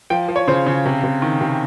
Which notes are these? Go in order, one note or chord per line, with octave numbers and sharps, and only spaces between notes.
F3 G5
F3
C#5
C#3 C5
C#3
C3
C3
D#3
C3